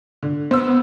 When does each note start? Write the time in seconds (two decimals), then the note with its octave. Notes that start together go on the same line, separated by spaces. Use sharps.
0.23 D3
0.51 B3 C5 E6